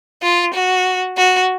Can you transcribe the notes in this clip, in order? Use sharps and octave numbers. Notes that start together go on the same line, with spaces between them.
F4
F#4
F#4